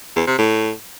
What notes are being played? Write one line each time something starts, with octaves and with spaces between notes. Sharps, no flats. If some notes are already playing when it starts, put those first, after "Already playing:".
E2
C3
A2